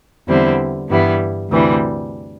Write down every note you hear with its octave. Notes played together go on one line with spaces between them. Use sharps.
E2 D3 G3 C4 E4
G2 E3 G3 B3 E4
D2 C3 E3 G3 D4